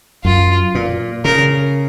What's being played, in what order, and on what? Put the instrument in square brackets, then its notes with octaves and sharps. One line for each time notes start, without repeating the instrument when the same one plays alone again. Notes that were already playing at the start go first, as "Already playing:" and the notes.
[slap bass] F#2 [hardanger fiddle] F4
[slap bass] A#2
[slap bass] C#3 [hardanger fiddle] A#4